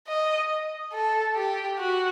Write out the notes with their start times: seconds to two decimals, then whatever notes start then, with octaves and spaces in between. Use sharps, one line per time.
0.08 D#5
0.93 A4
1.36 G4
1.79 F#4